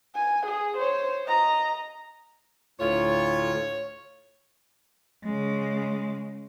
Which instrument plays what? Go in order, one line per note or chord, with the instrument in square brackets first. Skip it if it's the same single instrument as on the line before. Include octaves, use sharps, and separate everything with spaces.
[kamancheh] G#5
G#4
C5 C#5
D#5 A#5
[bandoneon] D2 F4 [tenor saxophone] A2 [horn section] C#5
[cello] C#3 G#3